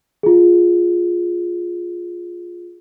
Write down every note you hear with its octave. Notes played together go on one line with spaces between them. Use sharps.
F4 G#4